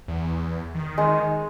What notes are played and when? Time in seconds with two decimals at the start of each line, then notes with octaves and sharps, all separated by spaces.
0.08 E2
0.75 D#3
0.98 G#3 G#5